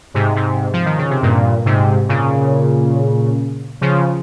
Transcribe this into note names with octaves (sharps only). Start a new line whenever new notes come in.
G#2 C3
G#2 C3
F3
D#3
C#3
C3
G2 A#2
G#2 C3
A#2 C#3
C#3 F3